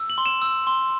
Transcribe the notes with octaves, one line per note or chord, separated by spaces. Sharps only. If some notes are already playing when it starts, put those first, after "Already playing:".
Already playing: E6
F#7
C6
E7
E6
C6